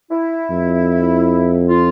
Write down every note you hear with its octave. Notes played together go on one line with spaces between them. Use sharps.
E4
F2
F4